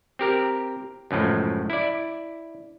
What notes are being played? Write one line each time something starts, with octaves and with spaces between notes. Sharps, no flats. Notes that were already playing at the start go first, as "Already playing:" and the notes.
C4 G4 A#4
C#2 F#2 A2 F3
E4 D5